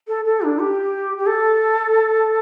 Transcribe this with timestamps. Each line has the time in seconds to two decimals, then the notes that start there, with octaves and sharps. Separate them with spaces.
0.08 A4
0.25 A4
0.42 D4
0.59 G4
1.18 G4
1.26 A4